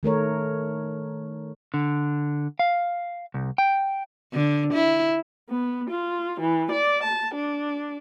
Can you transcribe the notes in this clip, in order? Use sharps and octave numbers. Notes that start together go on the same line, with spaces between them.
D#3 A3 A#4 C#5
D3
F5
C2
G5
D3
E4
B3
F4
E3
D5
A5
D4